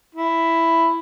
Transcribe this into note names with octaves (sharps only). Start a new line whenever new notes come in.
E4